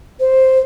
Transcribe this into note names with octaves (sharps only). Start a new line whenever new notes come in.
C5